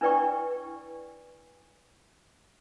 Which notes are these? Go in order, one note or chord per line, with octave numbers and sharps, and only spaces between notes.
D4 E4 B4 D5 G5 C#6